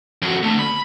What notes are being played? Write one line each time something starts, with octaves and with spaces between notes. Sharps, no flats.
F2 F#4
D3 A3
B5